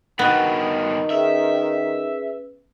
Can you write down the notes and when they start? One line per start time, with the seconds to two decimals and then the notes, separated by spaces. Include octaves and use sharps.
0.19 G2 B2 D#3 B3
1.10 C#4 G#4 B4 E5